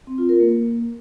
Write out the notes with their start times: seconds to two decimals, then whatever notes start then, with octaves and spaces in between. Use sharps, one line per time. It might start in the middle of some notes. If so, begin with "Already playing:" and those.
0.07 C4
0.18 F4
0.29 A#4
0.40 A#3